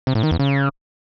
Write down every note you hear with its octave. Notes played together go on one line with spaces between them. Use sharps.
C3
A2
D#3
E2
C#3